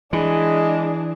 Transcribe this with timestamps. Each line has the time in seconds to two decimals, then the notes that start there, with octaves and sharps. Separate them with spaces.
0.13 E3 G#3 D4 G#4